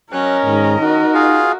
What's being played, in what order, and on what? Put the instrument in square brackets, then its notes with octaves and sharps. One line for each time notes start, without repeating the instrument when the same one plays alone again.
[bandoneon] F#3 F#6 [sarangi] C#4 [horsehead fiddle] A#4 D#5
[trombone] G#2 [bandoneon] D#3
[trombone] D#4 [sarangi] F#4
[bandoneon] F4 G#4 F5